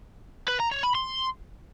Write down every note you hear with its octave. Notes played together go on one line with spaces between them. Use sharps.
B4
A#5
C#5
B5
C6